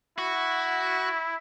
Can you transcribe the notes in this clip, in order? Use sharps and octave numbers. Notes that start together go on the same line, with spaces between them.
E4 F#4